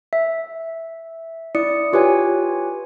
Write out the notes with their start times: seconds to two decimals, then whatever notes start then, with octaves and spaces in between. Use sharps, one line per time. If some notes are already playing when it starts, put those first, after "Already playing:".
0.13 E5
1.55 E4 D5 D#6 C#7
1.93 F4 G4 B4 C#5 G#5